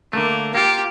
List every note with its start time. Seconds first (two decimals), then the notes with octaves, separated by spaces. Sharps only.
0.13 D3 A3 A#3
0.55 A#3 F4 G4